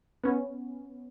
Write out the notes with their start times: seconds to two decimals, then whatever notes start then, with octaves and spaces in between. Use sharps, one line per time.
0.24 B3 C#4